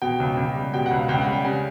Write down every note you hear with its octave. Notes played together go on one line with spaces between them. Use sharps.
B2 G5
C#2
C#2
G3
B2 G5
F#5
C#2
F5
C#2 G5
F#5
G3
G5
C#3 G#5